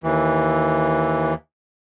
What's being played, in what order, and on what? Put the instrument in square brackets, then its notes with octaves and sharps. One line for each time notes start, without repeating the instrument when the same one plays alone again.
[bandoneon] D#2 E3